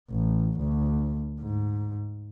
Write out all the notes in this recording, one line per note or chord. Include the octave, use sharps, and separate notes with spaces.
A1
D2
G#2